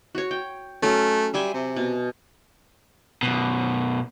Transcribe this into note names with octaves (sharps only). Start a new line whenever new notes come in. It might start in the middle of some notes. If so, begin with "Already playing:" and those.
F#4 C#5
G5
F#3 A3 C#4
G3 E5 G#5 C6
C3
B2
F#2 B2